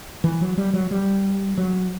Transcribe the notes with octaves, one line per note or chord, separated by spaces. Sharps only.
E3
F#3
G3
F#3
G3
F#3